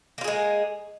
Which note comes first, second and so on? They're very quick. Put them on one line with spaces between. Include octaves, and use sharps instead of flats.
A#3 F4 G#4 G#3